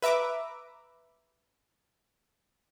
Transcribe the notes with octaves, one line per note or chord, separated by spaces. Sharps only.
B4 E5 A#5 D6